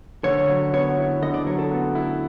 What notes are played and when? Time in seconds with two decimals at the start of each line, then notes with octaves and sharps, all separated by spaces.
0.24 D3 C#5
0.49 F#3
0.73 B3 C#5
0.98 E4
1.22 D3 D#5
1.34 D5
1.47 F#3 C#5
1.59 A4
1.71 B3
1.95 E4